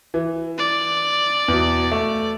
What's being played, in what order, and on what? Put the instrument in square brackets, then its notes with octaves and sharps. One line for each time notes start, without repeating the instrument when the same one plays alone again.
[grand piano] E3
[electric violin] D5
[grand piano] E2 B2
A3